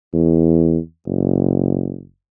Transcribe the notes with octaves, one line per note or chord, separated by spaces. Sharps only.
E2
F#1